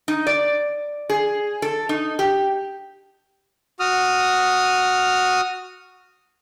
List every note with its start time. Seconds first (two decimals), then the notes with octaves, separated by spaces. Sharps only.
0.08 D#4
0.27 D5
1.09 G#4
1.62 A4
1.89 D#4
2.19 G4
3.80 F#4 D#6 F6